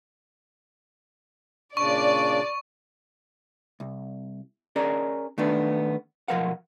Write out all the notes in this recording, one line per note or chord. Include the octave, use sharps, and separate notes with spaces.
A#2 C#3 D4 D5 C#6
C2
C#4 G#4 A#4 D5 D#5
D#3 A3 B3 D4
B1 F2 F3 A#4 F5 F#5